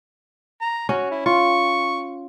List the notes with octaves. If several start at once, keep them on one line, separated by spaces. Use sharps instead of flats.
A#5
C#4 F#4
E4
F4 C#6